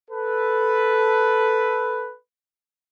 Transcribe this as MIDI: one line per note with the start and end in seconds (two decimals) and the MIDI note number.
0.11 2.14 69
0.11 2.14 71